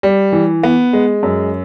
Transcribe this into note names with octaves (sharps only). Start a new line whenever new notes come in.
G3
E3
B3
G#3
F#2